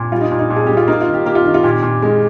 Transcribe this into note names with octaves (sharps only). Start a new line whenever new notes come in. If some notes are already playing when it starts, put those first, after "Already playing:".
Already playing: A#2
G3 F4
D#4
A#2
D#4
A#2
G#4
G3 G4
F4
A#3 D#4
F4
D#3
G4
A#3 G4
F4
D#3
F4
A#2 G4
A#2
G#3